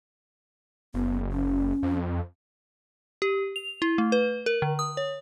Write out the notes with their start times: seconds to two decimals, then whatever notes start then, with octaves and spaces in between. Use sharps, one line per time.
0.94 F#1 B3
1.32 C#4
1.83 F2
3.22 G4
3.56 F7
3.82 E4
3.98 A3
4.12 B4
4.46 A#4
4.62 D3
4.79 D#6
4.97 C#5